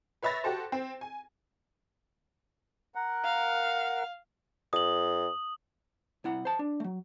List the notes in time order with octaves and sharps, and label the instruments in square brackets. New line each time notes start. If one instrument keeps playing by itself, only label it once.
[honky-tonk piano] B4 C#5 E5 B5 A6 A#6
F#4 G4 A4 C5
C4
G#5
[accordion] A#4 F#5
[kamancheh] F5
[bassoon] F2 [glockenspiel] D#6 F#7
[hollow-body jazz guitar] C2 E4 F#5
C5 A5
D4
F#3 A3